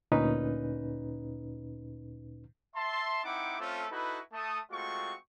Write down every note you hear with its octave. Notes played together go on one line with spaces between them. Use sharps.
D2 A#2 C#4 D#4 B4
E5 A5 C6
C4 D#4 E4 F#5 D6
A3 C4 C#4 F4 A4
D#4 E4 F#4 A4 B4
A3 A5 D#6
G#3 A3 C4 F4 F#4 C#6